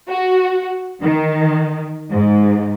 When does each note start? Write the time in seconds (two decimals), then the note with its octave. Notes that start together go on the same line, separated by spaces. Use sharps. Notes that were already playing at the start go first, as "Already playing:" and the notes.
0.10 F#4
1.02 D#3
2.11 G#2